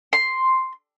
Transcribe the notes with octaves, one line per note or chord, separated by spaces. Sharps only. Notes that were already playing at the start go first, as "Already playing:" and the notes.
C6